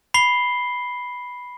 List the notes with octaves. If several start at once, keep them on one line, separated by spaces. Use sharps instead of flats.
B5 C7 G7